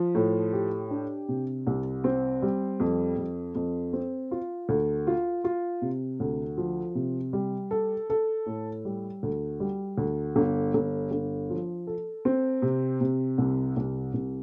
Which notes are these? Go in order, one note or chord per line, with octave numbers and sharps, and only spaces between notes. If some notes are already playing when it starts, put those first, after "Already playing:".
Already playing: F3
A2
G4
D4
C3
C2
C4
G3
F2
F2
F2
C4
F4
D2
F4
F4
C3
D2
F3
C3
G3
A4
A4
A2
G3
D2
G3
D2
G1
G1
G1
F3
A4
C4
C3
C3
C2
C2
C2